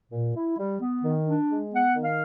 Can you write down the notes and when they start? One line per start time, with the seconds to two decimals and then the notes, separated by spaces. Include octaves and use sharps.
0.12 A#2
0.35 E4
0.57 G3
0.81 B3
1.04 D#3
1.26 D4
1.50 G#3
1.72 B3 F#5
1.96 D#3
2.04 F5